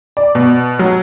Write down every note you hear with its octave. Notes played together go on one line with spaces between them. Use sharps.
D5
B2
F#3